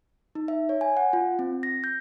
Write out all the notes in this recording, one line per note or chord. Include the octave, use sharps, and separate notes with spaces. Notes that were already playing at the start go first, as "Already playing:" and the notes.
D#4
E5
C#5
G#5
F#5
F4
C4
A#6
G6